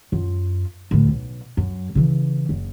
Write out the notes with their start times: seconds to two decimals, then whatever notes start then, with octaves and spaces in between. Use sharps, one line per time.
0.12 F#2 F4
0.91 D2 A2
1.09 B1
1.57 F#2
1.95 C#3 E3
2.49 F#1